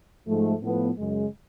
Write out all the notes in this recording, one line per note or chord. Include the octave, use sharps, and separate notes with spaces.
G#2 F3 A3
A2 F3 B3 F4 A4
F#2 C#3 G#3